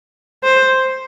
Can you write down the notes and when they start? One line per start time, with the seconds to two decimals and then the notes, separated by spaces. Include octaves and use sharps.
0.44 C5